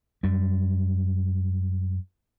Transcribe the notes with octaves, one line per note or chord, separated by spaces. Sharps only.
F#2 G3